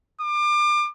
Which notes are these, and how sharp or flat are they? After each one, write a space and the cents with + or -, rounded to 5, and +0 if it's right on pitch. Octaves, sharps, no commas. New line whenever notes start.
D6 +30